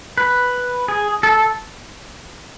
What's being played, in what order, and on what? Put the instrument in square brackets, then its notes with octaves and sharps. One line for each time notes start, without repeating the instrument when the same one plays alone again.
[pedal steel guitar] B4
G#4
A4